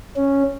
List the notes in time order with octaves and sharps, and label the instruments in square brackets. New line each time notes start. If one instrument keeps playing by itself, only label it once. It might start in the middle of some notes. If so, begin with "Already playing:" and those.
[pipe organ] C#4